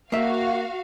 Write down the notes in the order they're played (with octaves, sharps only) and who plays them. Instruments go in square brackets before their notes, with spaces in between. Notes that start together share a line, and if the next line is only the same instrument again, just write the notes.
[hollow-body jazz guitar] A#3 E5 [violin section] F#4 F5